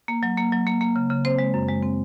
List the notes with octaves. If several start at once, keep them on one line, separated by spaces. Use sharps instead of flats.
A#3
F#3
A#3
F#3
A#3
A#3
C#3
C#3
C4 C5
G#3
F#2
G#3
C4